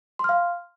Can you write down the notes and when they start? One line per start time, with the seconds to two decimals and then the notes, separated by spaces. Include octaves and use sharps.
0.19 C6
0.24 F6
0.29 F5